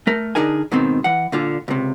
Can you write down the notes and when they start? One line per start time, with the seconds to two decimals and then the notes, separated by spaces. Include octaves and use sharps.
0.07 A3 A#4
0.35 D3 D4 D#4 G#4 A#4 G#5
0.71 G#2 B2 D#3 C4
1.04 E3 F#5
1.32 A#2 D3 F4
1.68 C#2 C3